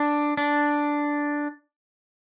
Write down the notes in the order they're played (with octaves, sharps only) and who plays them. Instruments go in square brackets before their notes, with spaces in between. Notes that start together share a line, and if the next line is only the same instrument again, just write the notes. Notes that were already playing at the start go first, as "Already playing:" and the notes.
Already playing: [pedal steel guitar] D4
D4